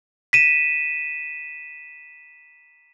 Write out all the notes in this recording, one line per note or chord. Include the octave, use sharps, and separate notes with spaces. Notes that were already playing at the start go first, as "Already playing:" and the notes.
B6 D#7 E7